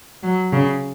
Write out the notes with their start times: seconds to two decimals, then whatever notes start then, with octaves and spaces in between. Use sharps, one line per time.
0.23 F#3
0.53 C#3